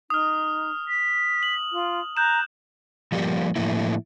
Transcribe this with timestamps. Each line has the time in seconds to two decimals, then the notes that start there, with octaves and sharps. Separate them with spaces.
0.10 D#4 D#6 F6
0.88 B6
1.43 F#7
1.72 F4
2.17 A#5 F#6 G6 E7
3.12 F3 G3 A#3 G4
3.56 A2 F3 A3 A#3 E4